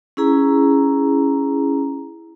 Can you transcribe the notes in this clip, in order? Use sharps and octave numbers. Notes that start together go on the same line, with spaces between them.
C#4 E4 G#4 A#5